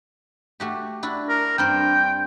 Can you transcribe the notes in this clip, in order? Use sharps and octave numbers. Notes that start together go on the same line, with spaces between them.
A3 F#4 G4
D4 E4 F#4
A#4
G2 C4 C5 G5